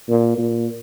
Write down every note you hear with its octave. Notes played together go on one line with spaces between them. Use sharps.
A#2
A#2